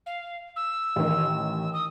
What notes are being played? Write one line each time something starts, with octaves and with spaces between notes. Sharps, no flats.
F5
E6
A1 D#3
D#6